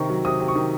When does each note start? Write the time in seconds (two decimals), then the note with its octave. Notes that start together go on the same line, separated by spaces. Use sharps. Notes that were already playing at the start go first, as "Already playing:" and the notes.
Already playing: C3 D#3 C#6
0.10 F#3
0.25 C3 D#6
0.40 C3
0.48 C#6
0.55 D#3